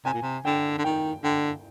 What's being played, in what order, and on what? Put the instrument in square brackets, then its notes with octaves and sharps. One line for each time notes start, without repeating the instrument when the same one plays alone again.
[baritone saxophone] C3 [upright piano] G#5
[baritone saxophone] A#2
C3
[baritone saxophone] D3 [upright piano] G5
[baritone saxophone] D3
[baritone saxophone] D#3 [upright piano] G5
[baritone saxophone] D3 [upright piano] G5